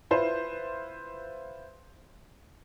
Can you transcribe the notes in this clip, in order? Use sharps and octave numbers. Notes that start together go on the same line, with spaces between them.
E4 F4 B4 C5